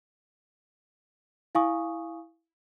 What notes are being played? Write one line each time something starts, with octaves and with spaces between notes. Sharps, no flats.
E4 F5 G#5 C#6 D#6